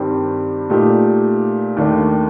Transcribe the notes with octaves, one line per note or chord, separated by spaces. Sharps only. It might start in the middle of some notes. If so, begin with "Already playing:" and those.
Already playing: G2 D#3 G3 C4 G4
A#2 A3 D#4 G4
D#2 D#3 A3 D4